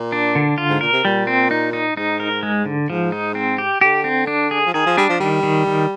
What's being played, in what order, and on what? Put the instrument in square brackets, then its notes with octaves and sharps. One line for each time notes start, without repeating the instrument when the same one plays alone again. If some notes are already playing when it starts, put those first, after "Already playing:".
Already playing: [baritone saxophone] A#2
[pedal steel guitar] D4
D3
F4
[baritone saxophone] G#2
[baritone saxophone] A#2 [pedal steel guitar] A#4
[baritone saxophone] C3
[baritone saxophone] A#2 [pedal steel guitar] G3
[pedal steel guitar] C4
D#4
D#4
[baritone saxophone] G#2 [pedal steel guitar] D#4
[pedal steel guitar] A#4
G#3
D3
[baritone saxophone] G#2 [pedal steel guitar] F3
[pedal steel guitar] D#4
C4
G4
[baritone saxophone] D3 [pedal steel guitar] G4
[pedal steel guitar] C4
D4
G#4
[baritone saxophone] F3
[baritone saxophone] D#3 [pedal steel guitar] G#4
[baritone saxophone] F3
[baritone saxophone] G3 [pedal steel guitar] D4
[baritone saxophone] F3
[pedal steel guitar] D#3 [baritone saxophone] G3
[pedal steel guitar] D#3
D#3